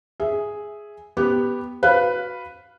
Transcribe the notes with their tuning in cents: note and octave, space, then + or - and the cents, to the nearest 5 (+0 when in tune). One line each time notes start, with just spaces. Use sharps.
G#4 +0 E5 +0
B3 -5 G4 +0
F#4 +0 B4 +0 F5 +0